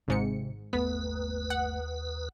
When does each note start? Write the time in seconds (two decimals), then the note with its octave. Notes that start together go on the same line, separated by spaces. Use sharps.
0.08 G#1 G#2 C3 C4 C#7
0.73 G1 D#2 A3 B3 B4
1.50 F#5